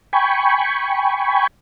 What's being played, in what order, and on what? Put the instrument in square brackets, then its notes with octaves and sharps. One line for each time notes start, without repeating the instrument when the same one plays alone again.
[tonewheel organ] G5 G#5 B5 C#6